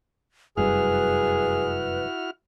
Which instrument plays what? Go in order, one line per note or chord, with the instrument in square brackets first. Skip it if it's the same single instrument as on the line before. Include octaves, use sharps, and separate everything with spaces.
[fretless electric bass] F1 F#2 G3 [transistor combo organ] E4 F#4 F6 [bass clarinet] G#4 [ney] B4